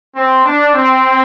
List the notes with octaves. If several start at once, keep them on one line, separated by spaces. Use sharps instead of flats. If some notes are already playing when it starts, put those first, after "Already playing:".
C4
D4
C4